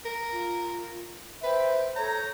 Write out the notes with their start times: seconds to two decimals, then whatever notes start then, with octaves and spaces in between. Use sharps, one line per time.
0.05 A#4
0.32 F4
1.43 B4 C5 E5 G5
1.96 A4 C#5 A#5 G6